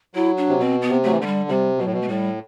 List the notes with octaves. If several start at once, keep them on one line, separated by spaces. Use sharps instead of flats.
F#3 E4
D4
C3
B2 C4
B3
C3
F#3 A3
E3
D3 A3
G3
C3 G3
B2 F#3
A2
B2
A3
A2 G3